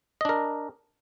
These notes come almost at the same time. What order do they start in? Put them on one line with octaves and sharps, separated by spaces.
D#5 D4 A#4